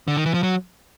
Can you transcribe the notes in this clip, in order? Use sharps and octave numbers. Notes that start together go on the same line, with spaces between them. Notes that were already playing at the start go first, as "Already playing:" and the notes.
D3
D#3
E3
F3
F#3